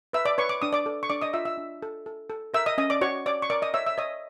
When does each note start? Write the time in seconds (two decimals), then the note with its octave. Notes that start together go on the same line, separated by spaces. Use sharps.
0.13 B4 E5 E6
0.25 D5 D6
0.38 B4 C#5 C#6
0.49 D6
0.62 D4 D#6
0.73 D5 D6
0.86 A4
1.03 C#6
1.10 D4 D5 D6
1.21 D#5 D#6
1.33 F4 E5 E6
1.45 E5 E6
1.57 D4
1.83 A4
2.06 A4
2.30 A4
2.54 A#4 E5 E6
2.66 D#5 D#6
2.78 C#4 D#5 D#6
2.90 D5 D6
3.01 F#4 C#5 C#6
3.26 C#5 D5 D6
3.42 C#6
3.50 A#4 D5 D6
3.62 D#5 D#6
3.74 C#5 E5 E6
3.86 E5 E6
3.98 C#5 D#5 D#6